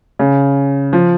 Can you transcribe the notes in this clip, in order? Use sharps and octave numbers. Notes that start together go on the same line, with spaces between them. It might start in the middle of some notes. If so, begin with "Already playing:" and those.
C#3
F3